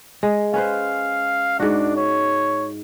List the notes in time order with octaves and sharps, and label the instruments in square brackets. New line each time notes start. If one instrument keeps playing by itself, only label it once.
[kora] G#3
[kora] C#4 B4 C5 [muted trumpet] F5
[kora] G#2 F#4 [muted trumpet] D4
[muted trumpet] C#5